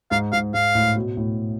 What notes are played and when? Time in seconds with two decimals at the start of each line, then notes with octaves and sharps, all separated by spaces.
0.11 G#2 F5
0.32 G#2 F5
0.54 G#2 F5
0.75 A2
0.96 B2
1.17 A2